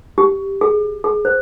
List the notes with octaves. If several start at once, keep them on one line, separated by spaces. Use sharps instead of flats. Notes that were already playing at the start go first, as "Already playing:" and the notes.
G4
G#4
G#4
C5